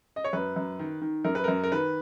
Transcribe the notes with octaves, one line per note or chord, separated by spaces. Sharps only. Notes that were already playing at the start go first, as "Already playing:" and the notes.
D#5
C#5
F#2 B4
F#2
D#3
D#3
F#2 A#4
B4
F#2 A#4
A#4
D#3 B4